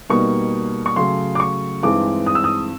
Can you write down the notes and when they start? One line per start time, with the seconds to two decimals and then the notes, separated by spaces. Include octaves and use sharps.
0.10 B2 G3 A#3 D#4 C#6
0.86 C#6
0.96 C#3 F#3 A3 C6
1.35 D6
1.40 C#6
1.83 G2 E3 G#3 C4 D#4 D6
2.26 D#6
2.35 E6
2.44 D#6